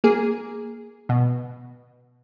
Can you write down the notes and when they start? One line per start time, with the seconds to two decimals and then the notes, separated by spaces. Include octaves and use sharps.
0.04 A#3 G#4
1.09 B2